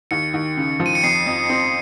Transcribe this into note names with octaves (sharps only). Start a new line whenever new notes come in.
D#2 C#7
D#2
C#3
F3
D#7
C#7
F2 C7
F2
C4